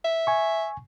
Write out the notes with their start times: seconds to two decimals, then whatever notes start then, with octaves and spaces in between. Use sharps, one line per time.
0.05 E5
0.27 G#5 C#6